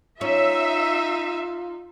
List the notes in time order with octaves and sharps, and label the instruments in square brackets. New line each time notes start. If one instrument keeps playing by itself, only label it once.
[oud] C#4 [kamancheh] D#4 [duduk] F4 [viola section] E5